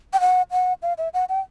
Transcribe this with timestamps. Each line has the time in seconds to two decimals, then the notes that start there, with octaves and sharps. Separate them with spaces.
0.13 G5
0.20 F#5
0.51 F#5
0.82 F5
0.98 E5
1.14 F#5
1.29 G5